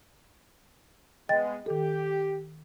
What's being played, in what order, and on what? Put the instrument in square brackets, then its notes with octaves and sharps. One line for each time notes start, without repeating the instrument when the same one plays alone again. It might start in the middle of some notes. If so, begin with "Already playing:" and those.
[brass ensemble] G#3 B3 [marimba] D#5 G5 A6
[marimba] D#3 A4 [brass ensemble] G4